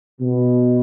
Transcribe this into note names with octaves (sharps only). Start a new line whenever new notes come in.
B2